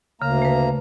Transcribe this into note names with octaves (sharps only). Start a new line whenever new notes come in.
D2 C#3 A#3 A#5
A3 B4